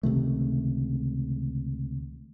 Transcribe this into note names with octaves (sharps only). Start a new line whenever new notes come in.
C#2 C3 D#3 A3